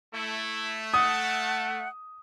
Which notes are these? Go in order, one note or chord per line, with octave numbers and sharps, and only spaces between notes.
A3 E4
F#5 A5 D#6